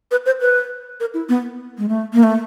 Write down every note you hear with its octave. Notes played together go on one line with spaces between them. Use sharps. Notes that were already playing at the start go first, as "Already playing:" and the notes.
B4
C5
B4
A#4
E4
B3
G#3
A3
A#3
A3